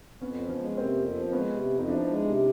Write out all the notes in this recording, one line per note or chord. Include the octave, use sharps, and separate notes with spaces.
F2 B3 C#4
F3
B3 C#4
G#3
C3 A#3 C4
F2
F3
G#3 B3 C#4
C3
F2
D#4
F3 D4 E4
G#3
C3